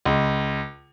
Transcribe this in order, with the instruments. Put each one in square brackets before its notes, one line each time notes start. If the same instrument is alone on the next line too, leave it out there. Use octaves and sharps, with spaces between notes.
[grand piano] C#2